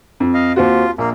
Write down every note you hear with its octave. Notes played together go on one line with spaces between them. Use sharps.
F2
D#5 F5
D#2 C4 F4 F#4
A#1 A#3